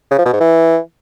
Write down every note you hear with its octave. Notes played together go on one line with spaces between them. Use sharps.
C#3
F3
B2
G#2
E3